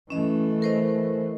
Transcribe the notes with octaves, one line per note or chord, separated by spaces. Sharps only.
E3 A3 C#4 D#5
A#4 C5 D#5